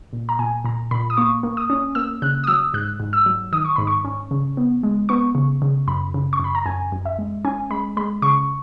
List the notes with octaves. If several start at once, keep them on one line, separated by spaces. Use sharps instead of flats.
A#2
A#5
A#2 G#5
A#2 A#5
A#2 B5
D#6
A#3 C#6
A#3
D#6
C#4
A#3 E6
C#3 F#6
D#6
F#3 E6
G#2 F#6
G#2
E6
F#3
D#3 D#6
C#6
G#2 B5
C#6
C#4
C#3
B3
G#3
B3 C#6
C#3
C#3
F#2 B5
C#3
C#6
F#2 B5
A#5
F#2 G#5
F#2
E5
G#3
C#4 G#5
G#3 B5
G#3 B5
C#3 C#6